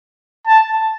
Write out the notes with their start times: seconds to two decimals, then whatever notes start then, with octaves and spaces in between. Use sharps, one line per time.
0.47 A5